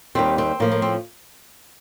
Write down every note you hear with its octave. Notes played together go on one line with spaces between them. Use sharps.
D#2 D#3 G3 C4
C4
A2 F3 A#3
A#3
C4